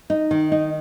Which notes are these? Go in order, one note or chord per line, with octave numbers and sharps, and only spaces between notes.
D#4
D#3
D#4